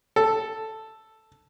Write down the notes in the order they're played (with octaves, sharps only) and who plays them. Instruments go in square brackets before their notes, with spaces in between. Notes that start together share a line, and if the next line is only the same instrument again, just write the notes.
[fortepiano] A4